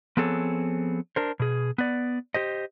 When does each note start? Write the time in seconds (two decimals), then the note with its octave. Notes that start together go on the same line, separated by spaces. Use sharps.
0.17 F3 B3 C4 G#4 A4 C#5
1.16 D4 A#4 C5
1.40 B2 G#4
1.78 B3 D5
2.34 G4 C5 D#5